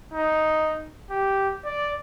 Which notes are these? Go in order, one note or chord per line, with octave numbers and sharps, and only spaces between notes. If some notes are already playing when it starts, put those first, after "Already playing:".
D#4
G4
D5